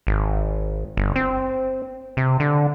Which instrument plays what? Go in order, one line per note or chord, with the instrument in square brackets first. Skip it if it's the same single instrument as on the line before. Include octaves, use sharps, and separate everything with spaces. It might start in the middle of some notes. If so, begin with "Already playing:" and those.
[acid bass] G#1
G1
C4
C3
D3